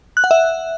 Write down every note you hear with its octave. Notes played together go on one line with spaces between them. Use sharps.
F#6
F#5
E5